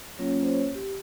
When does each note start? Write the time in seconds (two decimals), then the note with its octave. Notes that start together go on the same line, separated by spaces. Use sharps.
0.19 F#3 A#3 C#4 F4 C#5
0.42 C5
0.47 C#5
0.75 G4